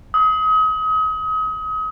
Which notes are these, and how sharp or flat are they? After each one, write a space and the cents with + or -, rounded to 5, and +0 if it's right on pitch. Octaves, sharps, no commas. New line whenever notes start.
D#6 +35